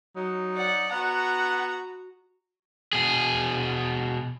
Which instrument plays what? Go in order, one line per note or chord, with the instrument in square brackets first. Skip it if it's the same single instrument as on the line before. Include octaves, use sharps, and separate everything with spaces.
[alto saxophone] F#3 [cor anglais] D#4
[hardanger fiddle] D5 F#5
[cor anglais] B3 [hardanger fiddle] F#4 A#5 [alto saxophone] F#5
[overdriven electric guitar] B2 G#4